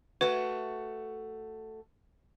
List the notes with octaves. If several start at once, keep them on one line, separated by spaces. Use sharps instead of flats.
A3 F#4 B4